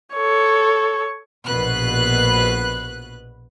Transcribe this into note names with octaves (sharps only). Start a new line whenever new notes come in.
A4 C#5
A#1 B2 B4 F#6